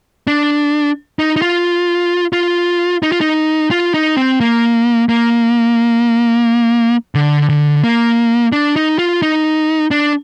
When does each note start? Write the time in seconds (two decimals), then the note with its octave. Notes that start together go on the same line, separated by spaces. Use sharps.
0.27 D4
1.19 D#4
1.36 D#4
1.42 F4
2.33 F4
3.03 D#4
3.12 F4
3.21 D#4
3.71 F4
3.94 D#4
4.17 C4
4.40 A#3
5.09 A#3
7.15 D3
7.49 D3
7.84 A#3
8.52 D4
8.76 D#4
8.99 F4
9.22 D#4
9.91 D4